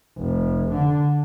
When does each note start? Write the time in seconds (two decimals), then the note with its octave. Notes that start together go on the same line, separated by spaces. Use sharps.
0.18 F1
0.73 D3